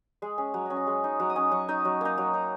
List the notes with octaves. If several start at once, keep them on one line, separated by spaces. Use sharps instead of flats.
G#3 G#4
C#4 G#4
F#3 C#5
C#4 D#5
D#5
G#3
D#4
F#3 F#5
D#6
C#4
F#3 C#6
D#4 D#5
F#3
A#3 D#4
F#3
D#4